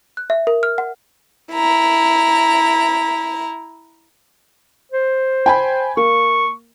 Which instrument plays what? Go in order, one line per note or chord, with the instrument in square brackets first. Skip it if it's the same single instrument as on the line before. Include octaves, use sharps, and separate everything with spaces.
[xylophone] F#6
E5
A#4
F6
F#5
[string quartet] E4 A#5
[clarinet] C5
[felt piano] G5 G#5 B5
[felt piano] A#3 [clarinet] C#6